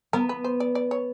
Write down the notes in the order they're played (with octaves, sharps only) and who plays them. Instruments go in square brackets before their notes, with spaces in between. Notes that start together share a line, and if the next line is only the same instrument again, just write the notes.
[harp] B3 [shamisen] A#4
[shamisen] B4
C5
D5
D5
C#5